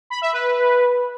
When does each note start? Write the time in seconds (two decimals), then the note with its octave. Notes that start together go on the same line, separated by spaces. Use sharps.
0.10 B5
0.22 E5
0.33 B4